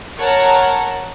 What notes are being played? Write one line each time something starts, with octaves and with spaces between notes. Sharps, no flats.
A#4 C#5 F#5 A5 A#5